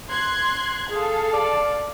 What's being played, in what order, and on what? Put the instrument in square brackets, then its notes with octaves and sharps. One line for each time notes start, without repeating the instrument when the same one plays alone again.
[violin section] C6 F#6 G#6
[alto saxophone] G#4 [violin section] A4 F5
[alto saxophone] D5